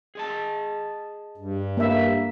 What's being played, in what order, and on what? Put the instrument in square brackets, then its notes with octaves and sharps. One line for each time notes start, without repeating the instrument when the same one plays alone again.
[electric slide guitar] G#4 D#5 A5
[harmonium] G2
[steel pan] A#3 E5